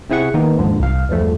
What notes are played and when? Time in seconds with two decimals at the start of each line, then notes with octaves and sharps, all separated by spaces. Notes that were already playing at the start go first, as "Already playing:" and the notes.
0.10 C3 C4 E4 G#4 F#5 C#6
0.34 D#3 A#3 B3 D#4
0.58 D#2 G#2 D3 F3
0.79 C2 F5
1.09 E2 G2 F3 A3